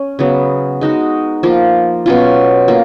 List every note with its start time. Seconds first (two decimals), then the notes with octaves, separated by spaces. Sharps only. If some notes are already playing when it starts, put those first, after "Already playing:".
Already playing: C#4
0.19 C#3 F#3 B3
0.81 G#3 D#4 F#4
1.43 F3 A#3 F4
2.06 B2 F#3 C#4 F4
2.68 A#3 F4